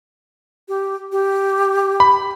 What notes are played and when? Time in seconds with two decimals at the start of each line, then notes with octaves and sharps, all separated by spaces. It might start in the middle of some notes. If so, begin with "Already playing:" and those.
0.68 G4
1.12 G4
2.00 B5